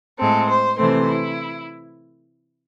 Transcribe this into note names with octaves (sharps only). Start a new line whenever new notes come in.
A2 G#3 C4 A4
C5
C3 E3 A3 C4 C5
E4